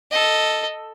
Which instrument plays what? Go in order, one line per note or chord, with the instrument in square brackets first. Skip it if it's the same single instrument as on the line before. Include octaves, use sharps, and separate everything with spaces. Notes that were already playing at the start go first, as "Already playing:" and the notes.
[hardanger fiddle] A4 D#5